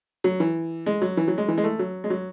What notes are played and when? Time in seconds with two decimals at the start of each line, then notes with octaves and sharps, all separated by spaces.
0.24 F#3
0.40 E3
0.86 G#3
1.02 F#3
1.17 E3
1.28 F#3
1.38 G#3
1.48 E3
1.58 G#3
1.64 A3
1.79 F#3
2.04 G#3
2.10 F#3